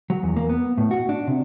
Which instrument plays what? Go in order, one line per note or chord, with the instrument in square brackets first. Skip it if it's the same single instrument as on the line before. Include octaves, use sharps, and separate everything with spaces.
[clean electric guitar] F#3
E2
A#3
B3
A2
F#4
D4
C3